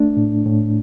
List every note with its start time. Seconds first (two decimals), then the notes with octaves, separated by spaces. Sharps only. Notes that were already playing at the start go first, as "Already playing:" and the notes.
Already playing: A3 D4
0.17 A2
0.46 A2